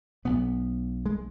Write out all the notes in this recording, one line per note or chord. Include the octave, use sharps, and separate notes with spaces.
B1 B2 B3
G#3